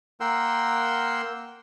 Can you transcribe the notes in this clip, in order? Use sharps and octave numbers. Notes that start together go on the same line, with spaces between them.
A#3 A#4 F#5 G5 C6 E6